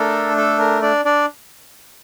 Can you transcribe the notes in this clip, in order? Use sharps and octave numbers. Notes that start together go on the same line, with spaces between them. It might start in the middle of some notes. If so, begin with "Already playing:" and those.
Already playing: A3 D4 A4 A#4
A4
A#4
D4 D5
D4 D5